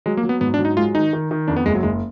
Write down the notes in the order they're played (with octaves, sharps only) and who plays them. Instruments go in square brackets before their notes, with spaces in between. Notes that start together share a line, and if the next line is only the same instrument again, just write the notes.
[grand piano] F#3 [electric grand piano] G#3
[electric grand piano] A#3
[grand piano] F#3
[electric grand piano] B3
[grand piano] G#2 [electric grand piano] B3
[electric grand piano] D4
[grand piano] F#3
[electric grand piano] D#4
[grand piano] G#3 [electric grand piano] F4
[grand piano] D#3 [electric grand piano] D#4
[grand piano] D#3
D#3
[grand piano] F2 [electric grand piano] D4
[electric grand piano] B3
[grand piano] F#1 [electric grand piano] G#3
[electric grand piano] F#3
[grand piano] F#1 [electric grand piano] G#3